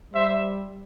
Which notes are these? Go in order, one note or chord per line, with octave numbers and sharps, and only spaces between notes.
G3 C5 E5